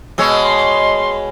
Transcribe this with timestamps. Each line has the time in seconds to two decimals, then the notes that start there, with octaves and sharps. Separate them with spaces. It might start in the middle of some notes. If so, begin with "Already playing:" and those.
0.18 B2 G#3 C#5 E6
0.43 C6